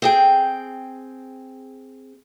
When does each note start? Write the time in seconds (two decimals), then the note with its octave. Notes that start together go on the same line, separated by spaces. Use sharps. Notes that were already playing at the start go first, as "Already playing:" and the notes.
0.02 C4 G#4 G5